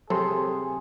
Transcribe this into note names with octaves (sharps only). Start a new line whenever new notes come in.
C3 F#3 G#4 A4 C6